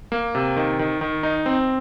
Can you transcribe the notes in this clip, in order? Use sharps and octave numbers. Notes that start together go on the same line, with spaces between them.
A#3
C3
D#3
D#3
D#3
D#4
C4